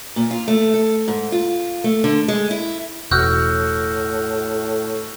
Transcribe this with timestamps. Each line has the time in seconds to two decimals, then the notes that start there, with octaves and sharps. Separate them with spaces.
0.16 A#2
0.31 F4
0.48 A3
0.74 A4
1.08 G#2
1.32 F4
1.84 A3
2.04 D3
2.28 G#3
2.51 E4
3.11 E1 A2 F#4 E6 F6 G6